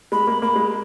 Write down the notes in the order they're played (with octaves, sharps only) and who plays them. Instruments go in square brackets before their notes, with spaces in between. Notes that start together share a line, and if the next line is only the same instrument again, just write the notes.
[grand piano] G#3 [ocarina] B5
[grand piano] A#3
[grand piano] A#3 [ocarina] B5
[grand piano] G#3